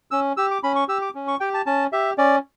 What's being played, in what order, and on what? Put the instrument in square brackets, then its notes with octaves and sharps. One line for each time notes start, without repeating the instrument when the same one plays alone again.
[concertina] C#4 E6
G4 E6
D6
C#4 B5
C#6
G4 E6
D6
C#4
C#6
G4 G5
A5
C#4 A5
G4 E5
C#4 D5